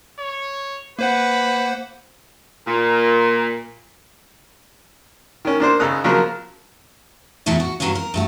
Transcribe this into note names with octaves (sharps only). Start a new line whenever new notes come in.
C#5
A#3 B4 C5 F#5
A#2
D#3 C#4
A#3 D4 C5
G#1 C#3 A4 A#5 D#6 F#6
C#3 F3 F#3 A#3 A#5
E2 A#2 E3 A3 B3
F#4
G2 E3 F#3 B3 C#4 F5
A#4
G2 A3 F#4